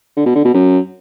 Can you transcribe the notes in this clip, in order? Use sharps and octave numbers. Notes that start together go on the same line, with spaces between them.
D3
B2
D3
B2
F#2